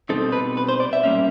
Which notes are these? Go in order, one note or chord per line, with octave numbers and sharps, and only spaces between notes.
B2 G3 C4 D#4 A4
B4
B4
C5
D5
E5
A#2 G3 A#3 C#4